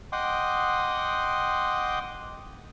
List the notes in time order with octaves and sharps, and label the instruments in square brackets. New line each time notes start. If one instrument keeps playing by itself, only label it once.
[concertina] D#5 F#5 G5 C6 D6 D#6